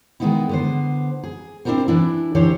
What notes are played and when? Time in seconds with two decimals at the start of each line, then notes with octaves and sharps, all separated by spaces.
0.20 D#3 G#3 A#3 B3 D#4 E4
0.49 D3 B3 C5
1.23 G#4
1.65 C4 D4 E4 F#4 A#4 C5
1.88 E3 D4 E4
2.35 D2 E3 D4 G4 C5 C#5